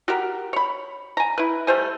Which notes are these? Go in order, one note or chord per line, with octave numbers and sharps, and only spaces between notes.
F#4 G4 A#4
C#5 B5
G#5 A#5
E4 B4
G3 A3 C5 G#5